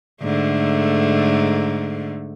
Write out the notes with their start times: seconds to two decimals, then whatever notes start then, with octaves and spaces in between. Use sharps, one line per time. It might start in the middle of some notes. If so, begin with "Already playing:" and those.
0.22 G#2 D3 A3